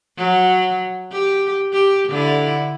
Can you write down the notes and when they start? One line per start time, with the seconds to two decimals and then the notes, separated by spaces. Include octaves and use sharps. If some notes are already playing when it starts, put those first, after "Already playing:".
0.18 F#3
1.12 G4
1.73 G4
2.09 D3 E4